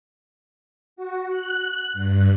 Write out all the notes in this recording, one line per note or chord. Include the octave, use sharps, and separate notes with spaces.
F#4
F#6
G2